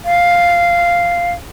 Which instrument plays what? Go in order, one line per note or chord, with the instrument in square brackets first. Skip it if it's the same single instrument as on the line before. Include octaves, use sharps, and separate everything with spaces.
[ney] F5